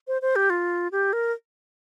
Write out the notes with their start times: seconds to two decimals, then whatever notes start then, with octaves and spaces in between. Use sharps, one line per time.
0.07 C5
0.22 C5
0.36 G4
0.50 F4
0.92 G4
1.13 A#4